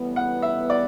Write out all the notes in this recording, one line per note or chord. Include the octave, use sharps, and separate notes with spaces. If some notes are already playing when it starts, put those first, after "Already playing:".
Already playing: A2 E3 G3 B3
F#5
E5
D5